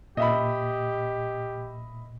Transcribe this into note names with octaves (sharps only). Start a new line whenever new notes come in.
A#2 G4 D#5 E5 B5